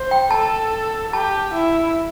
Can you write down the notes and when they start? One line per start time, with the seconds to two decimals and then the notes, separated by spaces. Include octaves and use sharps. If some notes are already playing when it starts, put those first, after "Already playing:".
Already playing: C5
0.11 G5
0.31 A4 A5
1.13 G4 A5
1.54 E4